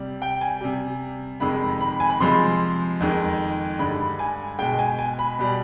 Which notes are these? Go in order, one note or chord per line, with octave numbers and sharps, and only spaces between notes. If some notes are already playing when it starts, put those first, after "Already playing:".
Already playing: C3 G3
G5
G#5
C3 G3
F2 C3 D#3 G#3 B5
B5
G#5
B5
C3 F3 G#3 C6
F2 D#3 G#3
G2 D3 G#3 B5
G#5
B2 G#3 G5
G#5
G#5
B5
B2 G3